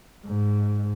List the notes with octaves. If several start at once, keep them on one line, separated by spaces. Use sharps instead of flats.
G#2